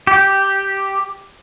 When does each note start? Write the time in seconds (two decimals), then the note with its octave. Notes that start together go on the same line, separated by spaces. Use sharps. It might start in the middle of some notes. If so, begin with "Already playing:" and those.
0.07 G4